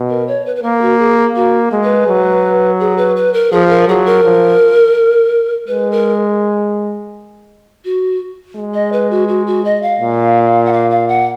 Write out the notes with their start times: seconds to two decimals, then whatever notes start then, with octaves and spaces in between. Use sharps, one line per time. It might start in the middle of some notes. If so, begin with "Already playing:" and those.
Already playing: B2
0.10 A#4
0.28 C#5
0.46 B4
0.56 B4
0.63 A#3 A#4
0.82 F#4
0.99 G#4
1.36 A#3 F#4
1.72 G#3
1.84 B4
2.08 F#3
2.80 G#4
2.98 B4
3.16 B4
3.34 A#4
3.52 F3 G#4
3.69 A#4
3.88 F#3 G#4
4.06 A#4
4.24 F3
5.68 G#3 B4
5.92 A#4
7.85 F#4
8.57 G#3
8.74 D#5
8.93 B4
9.11 F#4
9.28 F#4
9.47 F#4
9.65 D#5
9.82 F5
10.00 A#2
10.65 F#5
10.73 F5
10.91 F5
11.08 F#5